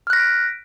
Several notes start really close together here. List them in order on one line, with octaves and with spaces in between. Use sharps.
F6 F#6 A#6 B6 D7